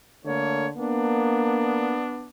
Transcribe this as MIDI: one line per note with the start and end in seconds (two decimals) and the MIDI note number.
0.25 0.72 50
0.25 0.66 57
0.25 0.66 58
0.25 0.66 73
0.78 1.96 58
0.78 2.28 59
0.78 2.28 62